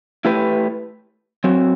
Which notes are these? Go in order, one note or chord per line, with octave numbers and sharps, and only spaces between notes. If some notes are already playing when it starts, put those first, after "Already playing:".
A3 E4 G4 B4
F#3 C4 F#4